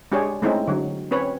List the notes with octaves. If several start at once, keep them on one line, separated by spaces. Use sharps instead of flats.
G#3 D4 G4 G#4 C#5
G#3 A3 C4 C#4 D#4 E4
D3 F#3
C4 C#4 B4 C#5